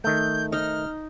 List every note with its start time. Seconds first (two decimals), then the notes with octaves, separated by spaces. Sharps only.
0.04 D#3 A3 G6
0.52 D#4 F6